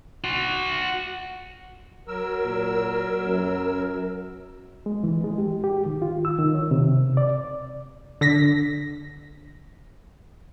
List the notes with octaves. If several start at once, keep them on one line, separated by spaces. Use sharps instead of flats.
F#4 C6
F#3 A#4 E6
A#2
F#2
G#3
E3
G#3
G4
G4
D#3
F4
E6
D#3
C#5
C3
D5
D3 A#6 B6